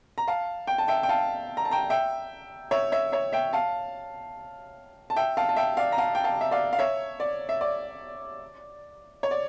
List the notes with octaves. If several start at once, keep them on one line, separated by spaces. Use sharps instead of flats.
A#5
F5 A5
G5
A5
E5 G5
G5
F5 A5
A#5
A5
G5 A#5
E5 G5
C#5 E5
C#5 E5
C#5 E5
E5 G5
F5 A5
A5
E5 G5
F5 A5
A5
E5 G5
D5 F5
A#5
F5 A5
G5
F5 A5
E5
D5 F5
F5
C#5 E5
D5
E5
D5
C#5
D5